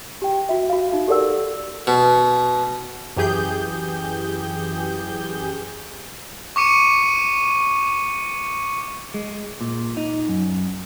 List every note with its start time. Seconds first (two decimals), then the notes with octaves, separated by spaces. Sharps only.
0.22 G4 G5
0.49 F#4 E5
0.70 F#4 F5
0.92 D#4 F#4
1.08 G4 A4 A#4 D5 F#5 E6
1.87 B2
3.17 F#2 E3 G4 G#4 G6
6.56 C#6 D6 C#7 D#7
9.14 G#3
9.61 A#2
9.97 D#4
10.29 F#2